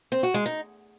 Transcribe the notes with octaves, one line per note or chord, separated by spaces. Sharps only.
C4
F#4
G#3
D#4